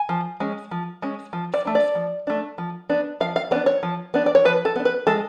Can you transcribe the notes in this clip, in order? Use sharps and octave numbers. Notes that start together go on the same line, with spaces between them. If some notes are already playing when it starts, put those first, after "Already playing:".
Already playing: G#5
F3
G#3 C#4
F3
G#3 C#4
F3
D5
A3 D4
D5
F3
A3 D4
F3
B3 D4
F3 F5
F5
B3 D4 D5
C#5
F3
B3 D4
D5
C#5
F3 B4
A4
B3 D4
B4
G#3 A4